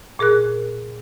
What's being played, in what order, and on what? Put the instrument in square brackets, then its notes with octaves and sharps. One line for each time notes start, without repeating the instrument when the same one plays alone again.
[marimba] A#2 G#4 A#4 F#6